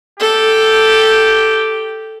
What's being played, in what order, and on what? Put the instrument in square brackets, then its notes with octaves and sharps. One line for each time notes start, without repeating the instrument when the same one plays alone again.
[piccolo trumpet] G4 [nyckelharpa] A4